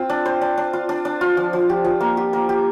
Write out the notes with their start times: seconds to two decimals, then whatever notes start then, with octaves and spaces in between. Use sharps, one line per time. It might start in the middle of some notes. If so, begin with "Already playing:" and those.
Already playing: C4 F4
0.10 D4
0.26 C5
0.41 D4
0.57 D4
0.73 F4
0.89 D4
1.05 D4
1.21 F4
1.37 F3
1.53 F3
1.70 G4
1.85 F3
2.01 A#3
2.17 G4
2.33 A#3
2.49 G4